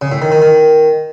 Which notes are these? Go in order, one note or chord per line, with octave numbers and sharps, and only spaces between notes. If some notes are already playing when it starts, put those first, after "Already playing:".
C#3
A2
D#3
D#3
D#3